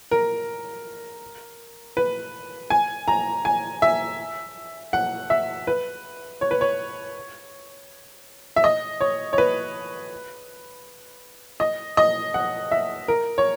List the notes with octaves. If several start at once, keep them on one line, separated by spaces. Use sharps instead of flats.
A#4
B4
G#5
A#5
G#5
E5
F#5
E5
B4
C#5
B4
C#5
E5
D#5
C#5
C#5
B4
D#5
D#5
F#5
E5
A#4
C#5